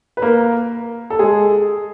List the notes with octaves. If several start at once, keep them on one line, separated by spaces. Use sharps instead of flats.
B4
A#3 A#4
A4
G#3 G#4